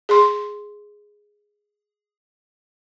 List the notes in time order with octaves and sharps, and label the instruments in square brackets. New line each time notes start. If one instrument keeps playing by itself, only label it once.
[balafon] G#4 C6